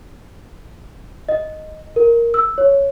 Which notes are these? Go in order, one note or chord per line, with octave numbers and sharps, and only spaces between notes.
D#5
A#4
E6
C#5